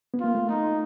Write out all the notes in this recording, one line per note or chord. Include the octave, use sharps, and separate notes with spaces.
B3
A#3 F4
A3
D#4